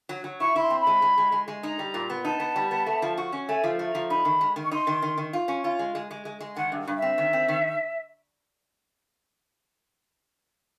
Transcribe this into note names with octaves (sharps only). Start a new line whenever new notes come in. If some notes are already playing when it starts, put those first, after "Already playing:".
F#3
F#3
E4 C#6
E4 C6
C4
B5
G#3
G#3
G#3
G#3
G#3
D#4 A#5
G3
A#2
B3
D#4 A5
B3
G3
B3
A3
F3
F#4
C#4
A3 G#5
F3
A3
A#5
F3
D#4 B5
D#3
G#3
D#3
C#6
D#4 C6
D#3
D#3
D#3
F4
C#4
F4
G#3
G#3
G#3
G#3
G#3
D#3 F#5
G2
G2
E5
C4
D#3
C4
D#3